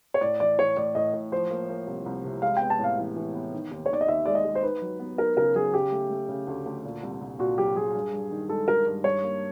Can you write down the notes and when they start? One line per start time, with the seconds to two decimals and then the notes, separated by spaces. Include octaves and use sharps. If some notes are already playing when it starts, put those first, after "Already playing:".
0.14 C#5
0.21 A2 D5
0.40 E3 D5
0.59 E3 C#5
0.77 A2 D5
0.95 A2 D#5
1.14 A2
1.32 F3 C5
1.50 A#3
1.69 A#3
1.87 C2
2.06 C2
2.24 C3
2.42 G#3 F5
2.57 B3 G5
2.70 A5
2.79 A2 F5
2.98 E3
3.16 E3
3.34 B3
3.53 D#3
3.71 D#2
3.86 C#5
3.89 D#3 D5
4.01 D#5
4.08 D#2 E5
4.26 G#3 D5
4.35 D#5
4.45 G#3
4.55 C5
4.63 D#4 B4
4.82 F#3
5.00 B3
5.18 D#4 A#4
5.37 C#3 A#4
5.55 F#3 G#4
5.73 C#3 G4
5.92 A3
6.10 A3
6.29 C#3
6.47 D2
6.66 D2
6.84 A#2
7.03 C2
7.21 C2
7.39 A#2 F#4
7.58 F#3 G4
7.76 F#3 G#4
7.95 G2
8.13 G2
8.31 D#3
8.49 G#3 A4
8.68 D#3 A#4
8.87 G2
9.04 G2 C#5
9.23 A#3